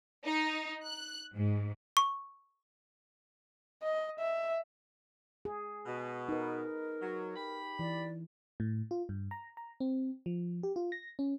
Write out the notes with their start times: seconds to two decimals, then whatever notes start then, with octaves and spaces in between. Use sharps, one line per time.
0.25 D#4
0.85 F#6
1.34 G#2
1.97 C#6
3.82 D#5
4.19 E5
5.45 G#4
5.86 B2
6.29 D#4 A#4 B4
7.01 F#3
7.36 G4 B5
7.79 E3 D5
8.60 A2
8.91 F4
9.09 G2
9.31 A#5
9.57 A#5
9.80 C4
10.26 F3
10.63 G4
10.76 F4
10.92 A#6
11.19 C#4